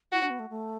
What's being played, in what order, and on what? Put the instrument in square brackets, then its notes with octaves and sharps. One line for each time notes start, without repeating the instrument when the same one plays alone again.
[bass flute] E4 [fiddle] F#4
[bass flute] D4
B3
A3
A3